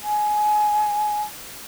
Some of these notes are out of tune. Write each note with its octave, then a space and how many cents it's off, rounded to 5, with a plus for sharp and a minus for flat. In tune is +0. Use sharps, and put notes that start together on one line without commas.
G#5 +20